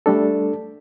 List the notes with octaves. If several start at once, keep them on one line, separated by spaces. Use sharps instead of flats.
G3 A3 D4 A4